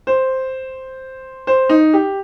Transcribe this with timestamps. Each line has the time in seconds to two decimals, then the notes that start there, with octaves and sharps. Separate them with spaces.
0.07 C5
1.47 C5
1.69 D#4
1.93 G4